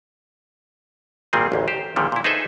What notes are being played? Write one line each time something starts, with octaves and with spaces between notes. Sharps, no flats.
G#1 A#2 D#3 G3 C4 G#4
A1 D2 G#2
G4 C5
A#1 A#2 D3 D#3 G3
A#2 E4
D#4 G#4 A4 B4 C5 E5